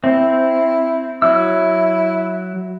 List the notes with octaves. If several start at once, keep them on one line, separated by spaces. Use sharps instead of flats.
C4 E4
F#3 E4 E6